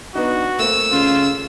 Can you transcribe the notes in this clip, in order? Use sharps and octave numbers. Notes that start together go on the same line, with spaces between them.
B3 D4 D#4 F#4
A3 A#3 C4 E6
C#3 F4